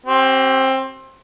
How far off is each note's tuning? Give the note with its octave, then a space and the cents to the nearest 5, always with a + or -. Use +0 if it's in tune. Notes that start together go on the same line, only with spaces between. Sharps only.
C4 +20 G4 -45 C5 +20